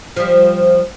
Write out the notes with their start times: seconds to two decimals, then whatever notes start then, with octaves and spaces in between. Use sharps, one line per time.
0.16 F3 G3